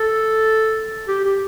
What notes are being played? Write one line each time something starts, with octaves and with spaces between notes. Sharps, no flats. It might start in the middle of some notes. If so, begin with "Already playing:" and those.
Already playing: A4
G4
G4